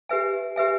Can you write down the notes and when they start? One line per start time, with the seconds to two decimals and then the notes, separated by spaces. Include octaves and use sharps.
0.09 G4 B4 E5 G#5
0.56 G4 B4 E5 G#5